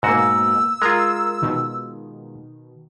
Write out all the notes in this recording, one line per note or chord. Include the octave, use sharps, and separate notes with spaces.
G#2 B2 A#3 F#4 E6
G#3 F4 A#4
B2 D#3